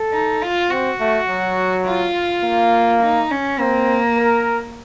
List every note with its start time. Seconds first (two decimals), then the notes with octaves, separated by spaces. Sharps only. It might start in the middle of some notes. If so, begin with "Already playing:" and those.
Already playing: A4
0.13 D#4
0.42 F4
0.70 C4 F#4
1.00 A3
1.28 F#3
1.86 F4
2.44 A#3
3.02 D#4
3.31 C#4
3.60 A#3 C4
4.18 A#4